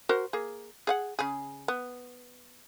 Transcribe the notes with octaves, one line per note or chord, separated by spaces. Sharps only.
F#4 A#4 C5
A#3 G#4
G#4 F5 F#5
C#3 G#4
B3